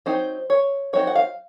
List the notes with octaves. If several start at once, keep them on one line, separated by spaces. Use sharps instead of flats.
F#3 C4 D#4 C5
C#5
F#3 C4 D#4 C#5
F#5
F5